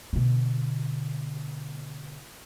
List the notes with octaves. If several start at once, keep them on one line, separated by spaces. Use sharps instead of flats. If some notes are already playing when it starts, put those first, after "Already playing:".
B2 D3